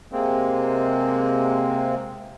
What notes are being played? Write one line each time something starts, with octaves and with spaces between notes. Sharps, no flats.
C3 G#3 A#3 C4